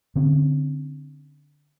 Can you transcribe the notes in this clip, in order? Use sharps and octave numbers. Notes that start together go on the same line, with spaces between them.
D3 C4 C#4